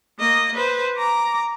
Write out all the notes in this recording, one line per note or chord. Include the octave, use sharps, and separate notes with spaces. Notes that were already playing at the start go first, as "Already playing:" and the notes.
A#3 D#5
B4 C5
A#5 D6